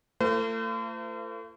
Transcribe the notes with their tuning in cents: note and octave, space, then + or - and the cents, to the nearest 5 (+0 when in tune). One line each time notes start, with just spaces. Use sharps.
A3 +40 F4 -40 C5 -45